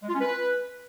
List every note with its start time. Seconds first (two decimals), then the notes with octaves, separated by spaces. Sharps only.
0.02 G#3
0.08 F4
0.14 C#4
0.20 B4